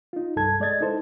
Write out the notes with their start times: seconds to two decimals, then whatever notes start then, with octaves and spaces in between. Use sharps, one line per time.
0.13 D#4 F4
0.36 C2 G2 A4 A5 G#6
0.60 G#3 D5 D#5 G#6 A6
0.81 D#4 E4 A4 C5